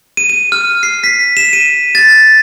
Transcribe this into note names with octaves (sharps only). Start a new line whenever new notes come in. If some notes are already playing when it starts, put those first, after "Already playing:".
D#7
D#7
F6
C7
B6
E7
D#7
A6